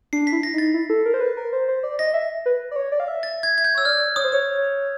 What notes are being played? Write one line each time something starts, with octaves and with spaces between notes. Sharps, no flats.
D4 C7
B6
E4
A#6
D#4 A6
E4
A4
A#4
C5
B4
A#4
C5
C5
D5
D#5 A#6
E5
B4
D5
C#5
D5
F5
E5
A6
G#6
G#6
G6
C#5 E6
D5 F6
C#5 D#6
C5
C#5 D#6